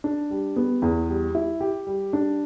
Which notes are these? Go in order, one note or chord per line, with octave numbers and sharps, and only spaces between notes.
D4
G3
B3
E2
G3
E4
G4
G3
D4